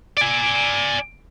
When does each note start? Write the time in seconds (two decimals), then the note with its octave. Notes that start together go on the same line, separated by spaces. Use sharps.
0.17 D5 G#5